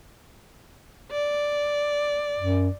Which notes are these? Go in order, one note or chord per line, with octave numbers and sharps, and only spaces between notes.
D5
F#2